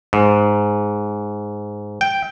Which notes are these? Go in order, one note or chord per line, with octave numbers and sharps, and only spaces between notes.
G#2
G5